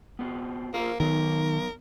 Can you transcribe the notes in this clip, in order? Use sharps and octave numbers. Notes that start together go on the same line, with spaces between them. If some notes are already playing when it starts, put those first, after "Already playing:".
B3 C4 F#4
A#3 F4 A#4 C5
D#3 F#3 B3 A#4